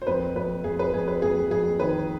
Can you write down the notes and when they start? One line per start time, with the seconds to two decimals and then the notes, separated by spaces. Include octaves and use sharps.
0.02 C5
0.07 F2 B4
0.35 F2 B4
0.64 F2 G#4
0.79 B4
0.94 F2 G#4
1.08 B4
1.22 F2 G#4
1.51 F2 G#4
1.80 D#3 B4